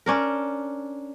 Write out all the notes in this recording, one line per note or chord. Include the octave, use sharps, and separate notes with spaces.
C#4 D4 A#4